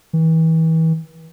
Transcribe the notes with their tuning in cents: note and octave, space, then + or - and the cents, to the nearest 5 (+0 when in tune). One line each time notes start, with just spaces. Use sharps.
E3 -35